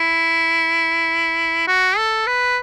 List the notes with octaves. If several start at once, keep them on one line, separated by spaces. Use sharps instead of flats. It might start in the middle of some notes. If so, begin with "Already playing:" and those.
Already playing: E4
F#4
A4
B4